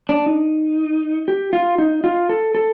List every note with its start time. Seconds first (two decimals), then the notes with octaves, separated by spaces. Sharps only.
0.09 D4
0.26 D#4
1.28 G4
1.53 F4
1.78 D#4
2.04 F4
2.29 A4
2.55 A4